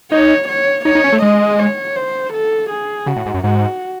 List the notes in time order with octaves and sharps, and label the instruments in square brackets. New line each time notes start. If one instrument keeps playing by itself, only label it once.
[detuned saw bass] D#4 [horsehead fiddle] C#5
[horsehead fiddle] C#5
[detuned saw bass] D#4 [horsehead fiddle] C#5
[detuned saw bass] D#4
C#4
A3
[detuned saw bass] G#3 [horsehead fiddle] D#5
[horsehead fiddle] C#5
C5
A4
G#4
[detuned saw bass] C#3 [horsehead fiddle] F#4
[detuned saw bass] A2
G#2
F#2
[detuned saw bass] G#2 [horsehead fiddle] F#4